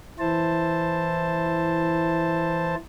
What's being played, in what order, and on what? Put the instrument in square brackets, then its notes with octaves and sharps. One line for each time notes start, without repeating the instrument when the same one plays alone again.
[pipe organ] E3 E4 C5 A5